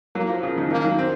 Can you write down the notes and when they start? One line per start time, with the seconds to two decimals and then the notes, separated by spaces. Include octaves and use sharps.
0.15 F#3 A#3
0.29 F3
0.43 C#3
0.58 D#3
0.71 D#3 A#3
0.85 F#3
0.99 C4